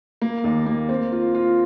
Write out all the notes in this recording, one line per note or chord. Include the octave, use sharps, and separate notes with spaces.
A#3
D#2
A#3
C4
F4
F4